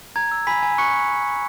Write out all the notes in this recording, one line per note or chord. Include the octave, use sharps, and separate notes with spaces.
A#5 G#6
E6
G#5 B5 B6
G#5
C#6 F#6 C#7